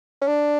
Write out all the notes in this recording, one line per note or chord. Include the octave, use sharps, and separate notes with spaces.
C#4
D4